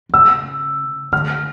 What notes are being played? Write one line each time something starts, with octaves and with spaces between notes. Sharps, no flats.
D3
C#3 E6
D3 F6